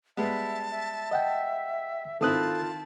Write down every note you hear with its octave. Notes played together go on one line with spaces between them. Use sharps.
G3 G#3 B3 E5 A5
E5
D#5 F#5 G5
D#3 C4 E4 F4 A4 A5 D#6 F#6